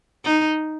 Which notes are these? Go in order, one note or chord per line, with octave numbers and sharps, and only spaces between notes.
D#4